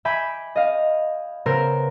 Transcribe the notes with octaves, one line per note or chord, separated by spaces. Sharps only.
E5 G5 G#5 B5 D6
D#5 F5
C#3 B3 A#4 C5 E6 D7